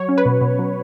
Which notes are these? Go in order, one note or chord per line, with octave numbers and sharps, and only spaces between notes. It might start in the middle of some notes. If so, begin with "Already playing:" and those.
Already playing: F#3 C#5
C#4
B4
B2
B2
F#3